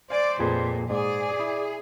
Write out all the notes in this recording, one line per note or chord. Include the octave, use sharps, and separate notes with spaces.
C5 D5 F5 G#5
F2 A#2 G#4 B4
G#2 G#4 D5
E4